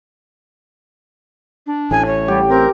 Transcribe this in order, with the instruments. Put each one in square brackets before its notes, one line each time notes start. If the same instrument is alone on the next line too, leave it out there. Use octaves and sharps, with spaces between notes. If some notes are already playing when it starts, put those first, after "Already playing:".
[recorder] D4
[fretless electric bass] A1 A2 [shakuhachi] G#5
[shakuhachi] C#5
[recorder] G3 [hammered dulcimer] G4
[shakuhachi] C4 [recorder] A#4